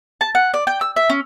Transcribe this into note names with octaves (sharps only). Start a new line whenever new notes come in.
A5
F#5
D5
G5
E6
E5
C#4